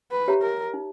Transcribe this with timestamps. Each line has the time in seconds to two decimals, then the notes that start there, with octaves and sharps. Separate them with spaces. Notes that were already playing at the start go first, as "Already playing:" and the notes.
0.12 B4
0.28 G4 C#5 E5 A#5
0.42 A#4
0.74 D#4